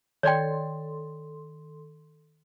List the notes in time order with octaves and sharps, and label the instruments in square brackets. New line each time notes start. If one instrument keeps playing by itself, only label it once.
[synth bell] D#3 A4 C6 [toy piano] C#5 D5 G5